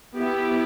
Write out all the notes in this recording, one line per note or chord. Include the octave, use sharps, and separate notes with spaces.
B3 E4 G4